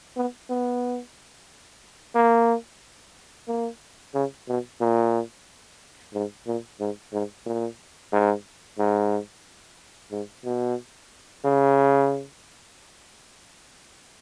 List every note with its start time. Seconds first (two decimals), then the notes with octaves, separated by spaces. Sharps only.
0.17 B3
0.50 B3
2.15 A#3
3.48 A#3
4.14 C#3
4.48 B2
4.81 A#2
6.14 G#2
6.47 A#2
6.80 G#2
7.13 G#2
7.46 A#2
8.13 G#2
8.79 G#2
10.12 G#2
10.45 B2
11.45 C#3